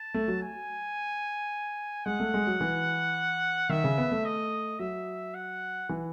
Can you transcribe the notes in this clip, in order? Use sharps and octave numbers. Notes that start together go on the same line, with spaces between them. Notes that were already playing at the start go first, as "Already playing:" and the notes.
Already playing: A5
A3
F#3
G#5
G#3 F#5
A3
G#3
F#3
E3
D#3 E5
C#3
B3
A3
D#5
F#3 E5
F#5
E3